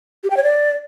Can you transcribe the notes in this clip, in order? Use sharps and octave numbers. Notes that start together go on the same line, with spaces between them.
G4
G5
C#5
D5